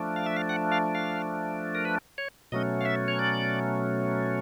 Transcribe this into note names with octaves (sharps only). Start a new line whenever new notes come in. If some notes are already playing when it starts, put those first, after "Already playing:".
Already playing: F3 A3 D4
F5
E5
F5
F#5
F5
F5
A#4
B4
C#5
B2 F#3 A3 C#4 D#5
F5
E5
C#5
D5